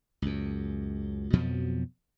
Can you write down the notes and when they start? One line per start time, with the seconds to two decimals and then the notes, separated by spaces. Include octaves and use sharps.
0.22 C#2 F#2
1.33 F2 B2 F3 F#3